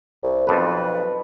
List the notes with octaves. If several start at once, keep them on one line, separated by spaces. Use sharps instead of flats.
C2
B1 F2 B4 A5